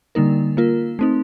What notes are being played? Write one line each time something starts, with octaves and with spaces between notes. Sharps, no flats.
D3 G3 A#3 D#4 A#4
A#3 F4 A#4
A3 C4 D#4